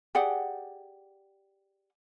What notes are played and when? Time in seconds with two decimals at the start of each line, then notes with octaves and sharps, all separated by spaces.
0.15 G4 G#4 D5 F#5